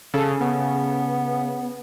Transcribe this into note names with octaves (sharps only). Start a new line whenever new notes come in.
C#3 A4
C#3 B3